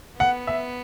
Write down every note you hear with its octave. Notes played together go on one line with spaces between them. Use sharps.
B3 F#5
E5